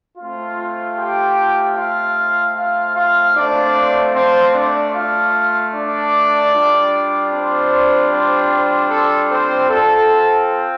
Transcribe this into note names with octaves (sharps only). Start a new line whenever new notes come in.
A3 C4 F4
G4 G5
F4 F5
F4 F5
F4 F5
A3 C4 D4 F4 D5
C4 C5
D4 D5
F4 F5
D4 D5
G3 D4 F4
C4 C5
C4 C5
C4 C5
A4
C4 C5
C4 F4 A4